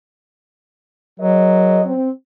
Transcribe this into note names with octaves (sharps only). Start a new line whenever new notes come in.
F#3 G#4 A#4 D#5
C4